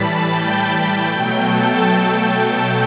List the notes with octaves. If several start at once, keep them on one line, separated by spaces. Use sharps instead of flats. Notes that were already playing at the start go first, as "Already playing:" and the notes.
Already playing: A2 E3 G3 A5 B5 A6 B6
G5 G6
B2 F#3 A3 G5 G6
A4 A5